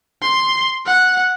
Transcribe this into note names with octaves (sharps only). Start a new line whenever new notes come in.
C6
F#5